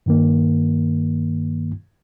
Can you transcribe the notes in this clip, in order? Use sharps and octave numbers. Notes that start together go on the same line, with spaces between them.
G2 D#3 A#3